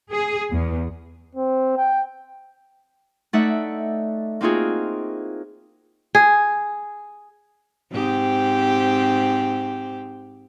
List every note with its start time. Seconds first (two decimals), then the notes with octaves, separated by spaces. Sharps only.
0.13 G#4
0.52 E2
1.35 C4
1.77 G5
3.33 A3 D#4 D5 E5 F#5
4.41 A#3 C4 D#4 F4 F#4 G#4
6.15 G#4
7.92 G#2 C4 G4